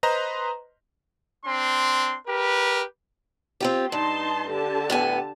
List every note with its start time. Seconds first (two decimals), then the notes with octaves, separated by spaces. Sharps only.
0.03 B4 C5 D#5 A#5 C6
1.45 C4 D4 C6
2.26 G4 A#4 B4
3.60 C4 F4 G4
3.92 G2 D#4 A5 C6
4.50 D3 G4 A5
4.90 A2 B3 G#5